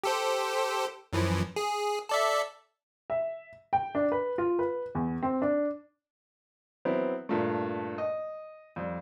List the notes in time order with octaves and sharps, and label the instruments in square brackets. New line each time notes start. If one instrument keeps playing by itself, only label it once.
[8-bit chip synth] G4 A4 C5
F#2 E3 F3
G#4
A4 D5 E5
[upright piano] E5
G5
D4
B4
F4
B4
E2
C4
D4
[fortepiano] F#3 B3 C4 E4
G2 A#2 A3
D#5
F2 G3